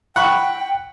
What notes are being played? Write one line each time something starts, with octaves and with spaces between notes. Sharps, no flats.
F#5 G5 B5 C#6